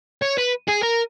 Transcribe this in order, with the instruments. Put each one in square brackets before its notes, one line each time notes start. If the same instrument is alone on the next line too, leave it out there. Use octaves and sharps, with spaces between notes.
[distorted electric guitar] C#5
B4
G#4
A#4